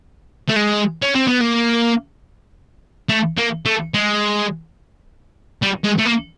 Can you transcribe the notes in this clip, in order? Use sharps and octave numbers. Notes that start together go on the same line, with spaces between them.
A3
G#3
C#4
C4
B3
A#3
A3
A#3
A3
G#3
G3
G#3
A3
A#3